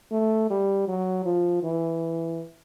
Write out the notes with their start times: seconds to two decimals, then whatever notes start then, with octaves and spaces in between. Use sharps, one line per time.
0.11 A3
0.50 G3
0.87 F#3
1.25 F3
1.63 E3